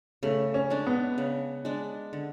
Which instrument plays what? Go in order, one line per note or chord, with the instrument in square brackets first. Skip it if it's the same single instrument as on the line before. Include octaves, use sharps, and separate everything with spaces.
[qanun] C#3 [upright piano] A3
[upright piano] C#4
[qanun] G#3 D4
[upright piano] B3
[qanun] C#3
G#3 D4
D3